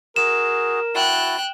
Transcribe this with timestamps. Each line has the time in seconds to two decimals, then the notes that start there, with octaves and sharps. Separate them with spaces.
0.16 F#4 G#4 A#4 E7
0.95 E4 F#4 G5 A5 F#6